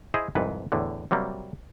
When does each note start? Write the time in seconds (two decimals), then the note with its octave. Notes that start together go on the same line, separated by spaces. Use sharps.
0.14 E4 G#4 C5 D#5
0.35 C2 F2 G#2 B4
0.72 E2 A2 D3
1.11 C3 F#3 G3 A#3